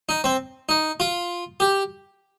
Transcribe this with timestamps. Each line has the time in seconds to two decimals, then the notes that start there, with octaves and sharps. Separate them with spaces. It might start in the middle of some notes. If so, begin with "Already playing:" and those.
0.09 D#4
0.24 C4
0.69 D#4
1.00 F4
1.60 G4